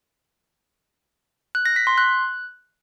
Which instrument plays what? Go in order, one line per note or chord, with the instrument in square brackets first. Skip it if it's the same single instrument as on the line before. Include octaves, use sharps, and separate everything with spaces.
[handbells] F#6
A#6
B6
C6
F#6